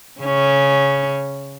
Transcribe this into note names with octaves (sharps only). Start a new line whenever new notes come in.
C#3 C#4